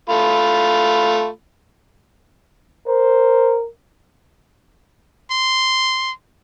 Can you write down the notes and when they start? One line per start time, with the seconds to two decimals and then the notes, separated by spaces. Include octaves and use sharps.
0.09 A3 F4 B5
2.88 A#4 C5
5.30 C6